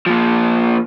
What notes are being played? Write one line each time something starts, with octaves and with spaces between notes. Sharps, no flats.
A#2 F3